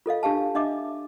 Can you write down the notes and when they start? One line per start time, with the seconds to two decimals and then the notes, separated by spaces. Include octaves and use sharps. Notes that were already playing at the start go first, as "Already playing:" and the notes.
0.06 F4 A4 D#5 F5
0.23 D4 G4 F5 A5
0.55 D4 D#5 E5 D6